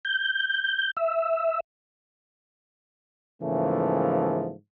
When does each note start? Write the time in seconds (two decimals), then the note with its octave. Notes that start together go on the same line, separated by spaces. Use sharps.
0.05 G6
0.97 E5
3.42 G#2 C#3 E3 F3 A3 A#3